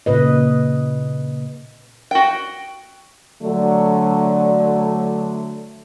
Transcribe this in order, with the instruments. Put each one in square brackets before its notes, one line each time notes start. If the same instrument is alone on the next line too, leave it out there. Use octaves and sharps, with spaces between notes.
[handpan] A#2 C#3 B4 D#5
[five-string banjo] F#4 G5
[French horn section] D3 F#3 A3